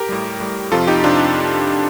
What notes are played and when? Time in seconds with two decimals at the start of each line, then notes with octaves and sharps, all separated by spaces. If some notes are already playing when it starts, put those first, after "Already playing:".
Already playing: G4 A#4
0.09 A2 G3
0.40 A2 G3
0.71 F2 C3 F3 F4 A4
0.87 D#4 G4
1.04 C3 D4 F4